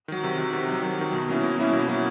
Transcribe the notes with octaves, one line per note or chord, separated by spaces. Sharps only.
D#3 F#3
C3
D#3 F#3
C3
D#3 F#3
C3
D#3 F#3
B2
F#3 A#3 C#4 E4
B2
F#3 A#3 C#4 E4
B2
F#3 A#3 C#4 E4